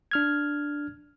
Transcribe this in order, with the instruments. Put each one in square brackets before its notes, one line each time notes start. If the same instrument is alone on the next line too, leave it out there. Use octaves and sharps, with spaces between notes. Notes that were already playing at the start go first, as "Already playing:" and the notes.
[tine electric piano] D4 F6 G#6